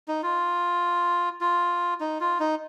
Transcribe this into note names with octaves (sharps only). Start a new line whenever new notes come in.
D#4
F4
F4
D#4
F4
D#4